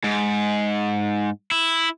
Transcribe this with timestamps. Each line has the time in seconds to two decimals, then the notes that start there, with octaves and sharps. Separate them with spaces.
0.04 G#2
1.51 E4